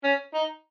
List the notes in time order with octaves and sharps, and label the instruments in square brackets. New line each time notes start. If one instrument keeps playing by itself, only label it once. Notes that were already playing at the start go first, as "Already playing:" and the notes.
[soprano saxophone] C#4
D#4